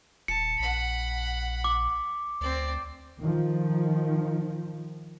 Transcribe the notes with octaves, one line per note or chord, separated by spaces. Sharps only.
D#1 A5 C#7
A#1 F#5 B5
D6
D2 C4 D5
D#3 F3